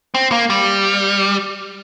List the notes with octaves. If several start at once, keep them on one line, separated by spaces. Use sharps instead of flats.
C4
A#3
G3